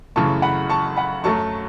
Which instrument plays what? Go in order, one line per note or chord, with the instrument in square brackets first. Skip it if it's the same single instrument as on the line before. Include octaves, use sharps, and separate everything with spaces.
[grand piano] F#2 C#3 E3 A3 A5 C#6
F#5 B5
A5 C#6
F#5 B5
F#2 F#3 A3 A5 C#6